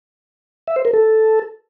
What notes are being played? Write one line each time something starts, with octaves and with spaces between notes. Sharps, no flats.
E5
C5
A#4
A4